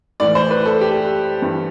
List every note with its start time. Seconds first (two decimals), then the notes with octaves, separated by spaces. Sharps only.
0.20 A2 E3 D5
0.35 C5
0.51 B4
0.65 A4
0.81 G4
1.42 G2 E3